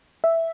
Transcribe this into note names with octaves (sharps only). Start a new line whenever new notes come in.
E5